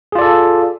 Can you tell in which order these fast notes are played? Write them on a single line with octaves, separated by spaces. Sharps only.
G#4 F4 D5 A4